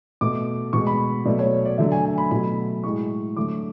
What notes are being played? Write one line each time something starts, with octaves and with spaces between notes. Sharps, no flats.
B2 A3 D6
B2 G#3 C#6
B5
B2 F#3 A3 D5
C#5
D5
D3 F#3 A3 E5
G#5
G#5
B5
B2 F#3 A3 B5
A2 G#3 C#6
D3 F#3 A3 D6